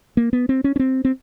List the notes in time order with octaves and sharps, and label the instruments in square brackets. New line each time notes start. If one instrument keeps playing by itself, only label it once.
[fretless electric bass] A#3
B3
C4
C#4
C#4
C4
C4